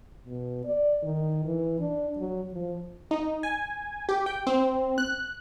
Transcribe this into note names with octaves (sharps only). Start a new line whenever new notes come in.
B2
D5
D#3
E3
D4
F#3
F3
D#4
G#5
G4
G5
C4
F#6